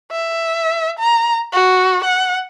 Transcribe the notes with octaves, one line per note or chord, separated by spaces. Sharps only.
E5
A#5
F#4
F#5